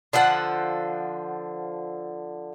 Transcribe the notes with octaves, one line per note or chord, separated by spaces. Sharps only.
D3 F3 A4 F#5